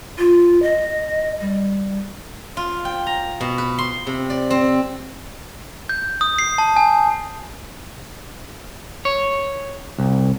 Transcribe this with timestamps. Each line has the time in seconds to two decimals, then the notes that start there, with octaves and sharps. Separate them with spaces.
0.18 F4
0.62 D#5
1.41 G3
2.57 F4
2.85 G5
3.07 A#5
3.41 B2
3.58 B4
3.79 C6
4.07 C3
4.30 D5
4.50 C4
5.89 G6
6.21 D#6
6.39 C7
6.58 A5
6.76 G#5
9.05 C#5
9.99 C2